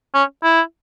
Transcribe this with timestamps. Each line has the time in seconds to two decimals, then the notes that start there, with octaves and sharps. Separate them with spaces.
0.15 C#4
0.44 E4